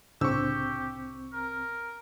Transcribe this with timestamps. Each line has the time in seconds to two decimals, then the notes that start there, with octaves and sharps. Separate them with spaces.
0.21 C2 A2 C#3 C4 D4 G4 C#6 E6
1.33 A#4